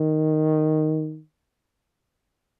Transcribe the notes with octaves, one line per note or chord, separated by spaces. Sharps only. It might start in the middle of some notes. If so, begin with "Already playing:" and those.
Already playing: D#3